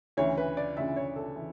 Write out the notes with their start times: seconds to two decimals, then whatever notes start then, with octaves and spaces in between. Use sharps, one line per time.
0.17 D2 C#3 E3 C#5
0.37 B4
0.57 D5
0.77 D2 C#3 E3 E5
0.96 C#5
1.16 A4
1.36 E3